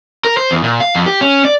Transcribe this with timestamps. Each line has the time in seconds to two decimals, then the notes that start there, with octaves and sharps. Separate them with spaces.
0.25 A#4
0.37 C5
0.51 E2
0.64 A#2
0.80 F5
0.95 F2
1.06 G4
1.21 C#4
1.45 D5